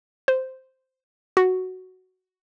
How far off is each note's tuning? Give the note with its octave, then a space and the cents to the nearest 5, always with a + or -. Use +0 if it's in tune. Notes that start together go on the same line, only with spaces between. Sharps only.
C5 -5
F#4 +5